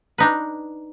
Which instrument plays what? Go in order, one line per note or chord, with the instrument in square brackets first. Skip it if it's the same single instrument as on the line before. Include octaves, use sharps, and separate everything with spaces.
[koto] D4 D#4 B4